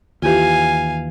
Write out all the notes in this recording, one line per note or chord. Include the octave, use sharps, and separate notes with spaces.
D#2 E3 F4 G4 F5 G#5